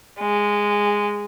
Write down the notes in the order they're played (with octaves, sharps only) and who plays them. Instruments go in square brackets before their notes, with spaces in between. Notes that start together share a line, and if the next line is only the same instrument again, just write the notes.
[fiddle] G#3